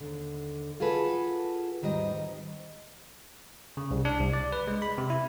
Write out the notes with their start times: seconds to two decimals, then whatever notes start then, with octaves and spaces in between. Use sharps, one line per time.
0.01 D#2 D3
0.80 F4 F#4 G#4 A4 B4
1.82 D#2 G#2 D#3 G3 C4 D#5
3.77 C#3
3.91 C2
4.05 D4
4.20 C2
4.33 D5
4.53 B4
4.67 G#3
4.82 B5
4.98 C3
5.10 E4